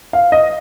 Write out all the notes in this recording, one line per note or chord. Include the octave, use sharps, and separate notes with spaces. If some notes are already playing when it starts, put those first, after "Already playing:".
F5
D#5